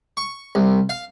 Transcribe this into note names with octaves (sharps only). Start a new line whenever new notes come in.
C#6
C2
F5